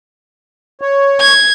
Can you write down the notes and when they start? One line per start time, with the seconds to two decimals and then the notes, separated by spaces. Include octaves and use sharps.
0.81 C#5
1.21 G#6